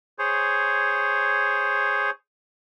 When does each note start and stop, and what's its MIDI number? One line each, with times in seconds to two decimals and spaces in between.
0.19 2.10 68
0.19 2.10 72
0.19 2.10 73